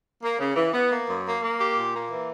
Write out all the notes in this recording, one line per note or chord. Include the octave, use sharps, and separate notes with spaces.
A#3
C#3
E3
B3
A#3
F#2
A#3
A#3
G4
A#2
A#3
E3